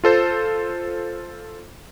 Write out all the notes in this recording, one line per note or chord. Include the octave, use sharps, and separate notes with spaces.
F4 A4 C5